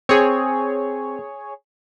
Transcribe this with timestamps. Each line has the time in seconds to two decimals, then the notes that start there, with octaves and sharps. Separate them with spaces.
0.09 C4 G#4 C#5